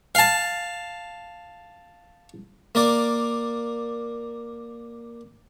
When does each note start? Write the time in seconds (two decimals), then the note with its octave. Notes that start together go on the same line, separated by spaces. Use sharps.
0.15 F5 A5
2.75 A#3 A#4 D5